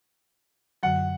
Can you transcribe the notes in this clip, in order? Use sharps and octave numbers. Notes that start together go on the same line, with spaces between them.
F#2 D3 F#3 F#5